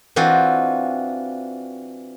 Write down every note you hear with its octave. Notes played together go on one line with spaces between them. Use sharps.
E3 C4 D4 F4 F#4